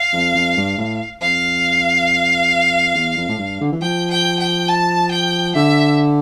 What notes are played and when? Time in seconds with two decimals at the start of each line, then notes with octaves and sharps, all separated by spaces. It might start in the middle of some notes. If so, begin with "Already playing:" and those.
Already playing: F5
0.13 F2
0.35 F2
0.57 G2
0.78 A2
1.22 F2 F5
2.95 E2
3.17 F2
3.29 A2
3.38 G2
3.61 D3
3.72 E3
3.82 F3 G5
4.11 G5
4.39 G5
4.68 A5
5.12 G5
5.55 D3 E5